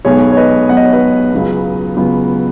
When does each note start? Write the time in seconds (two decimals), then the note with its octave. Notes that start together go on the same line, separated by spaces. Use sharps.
0.05 B1 B2 G#3 B3 G#4 C#5
0.32 C#5
0.37 B4 D#5
0.69 B1 B2 G#3 B3 F#5
0.77 D#5
0.85 C#5
0.92 B4 D#5
1.33 C#2 C#3 F#3 B3
1.97 C#2 C#3 F#3 B3